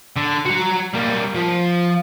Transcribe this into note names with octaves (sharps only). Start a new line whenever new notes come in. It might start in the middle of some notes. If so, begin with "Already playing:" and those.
D3
F#4 A#5
G3 A#3
F3